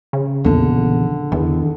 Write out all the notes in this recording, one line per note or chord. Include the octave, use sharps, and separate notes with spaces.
C#3
A#1 E2 D3
E2 D#3